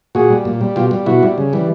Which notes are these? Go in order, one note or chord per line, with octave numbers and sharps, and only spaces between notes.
A#2 F#4 G#4
G3
A#2
G3
B2 F4 G4
G3
B2 E4 F#4
G3
C#3
E3 G3